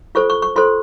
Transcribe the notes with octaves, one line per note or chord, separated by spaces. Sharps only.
F4 A4 C5 C#6
C#6
C#6
F4 A4 C5 C6